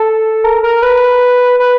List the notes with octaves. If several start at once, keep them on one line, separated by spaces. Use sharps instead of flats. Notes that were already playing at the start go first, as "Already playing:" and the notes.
Already playing: A4
A#4
A#4
B4
B4